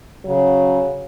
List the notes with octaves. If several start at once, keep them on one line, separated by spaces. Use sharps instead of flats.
C#3 F#3